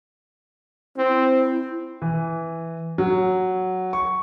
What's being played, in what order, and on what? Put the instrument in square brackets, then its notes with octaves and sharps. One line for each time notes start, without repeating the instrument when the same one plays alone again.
[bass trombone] C4 [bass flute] E4
[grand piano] E3
F#3
C#6